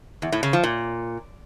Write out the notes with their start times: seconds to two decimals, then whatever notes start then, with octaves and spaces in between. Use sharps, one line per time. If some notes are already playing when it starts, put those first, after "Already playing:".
0.22 E2
0.32 A2
0.43 C#3
0.53 F3
0.63 A#2